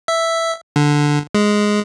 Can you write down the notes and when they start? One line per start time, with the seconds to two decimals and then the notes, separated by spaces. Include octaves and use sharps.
0.08 E5
0.76 D3
1.35 G#3